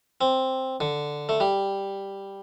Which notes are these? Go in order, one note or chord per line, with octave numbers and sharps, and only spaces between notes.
C4
D3
A3
G3